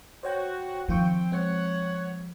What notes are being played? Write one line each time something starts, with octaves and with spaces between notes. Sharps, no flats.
F#4 C5 C#5 G5
D#3 F3 C4 F4 G5 C#6
G#3 C4 C#5 F#5